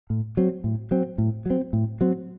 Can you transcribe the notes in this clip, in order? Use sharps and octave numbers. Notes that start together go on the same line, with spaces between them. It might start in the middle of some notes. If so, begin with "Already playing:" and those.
A2
F#3 C4
A2
F#3 C4
A2
F#3 C4
A2
F#3 C4